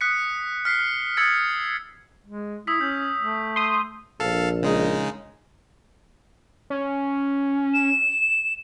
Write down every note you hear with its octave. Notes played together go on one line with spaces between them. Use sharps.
D#6 F#6 B6 C#7
F6 B6 C7
D#6 E6 G#6 A6 C#7
G#3
E4 D#6 E6 B6
C#4 G6
A3
C6 D#6
A#1 A4 F5
C#3 G#3 D#4
C#4
E7